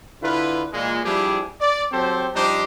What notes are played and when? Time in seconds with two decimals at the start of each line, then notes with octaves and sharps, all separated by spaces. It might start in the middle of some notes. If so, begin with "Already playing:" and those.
0.23 D3 E4 F4 B4
0.73 A#2 E3 G#3
1.04 F3 G3 D4 E4 G4 G#4
1.60 D5
1.91 F#3 C4 G4 A4 C5
2.34 F3 G3 D4 D#4 G4 C5